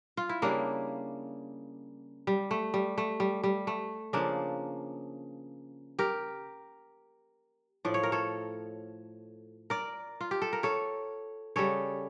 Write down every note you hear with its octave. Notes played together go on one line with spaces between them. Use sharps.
F4
E4
C#3 G3 A#3 D4
G3
A3
G3
A3
G3
G3
A3
C#3 F3 A#3 D4
G4 A#4
A2 F3 D5
C#5
A#4
A4 C#5
A#4 D5
F4
G4
A4
A#4
A4 C#5
C#3 G3 A4 C#5